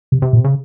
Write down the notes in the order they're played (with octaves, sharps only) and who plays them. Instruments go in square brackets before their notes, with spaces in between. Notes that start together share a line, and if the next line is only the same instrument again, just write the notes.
[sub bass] C3
[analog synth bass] C3
[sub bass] A#2
[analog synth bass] C#3